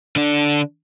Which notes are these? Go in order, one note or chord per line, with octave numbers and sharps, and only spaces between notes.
D3 D4